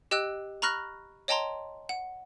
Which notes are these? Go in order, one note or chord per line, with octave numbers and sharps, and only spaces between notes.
G4 D#5 G5 E6 F#6
A#5 B5 C#6 F6 F#6 A#6
C#5 D#5 G5 A5 A#5 C6
F#5